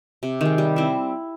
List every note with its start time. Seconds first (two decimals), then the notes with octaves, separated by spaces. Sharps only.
0.23 C3
0.41 D#3 G#3
0.58 G3
0.76 C4 E4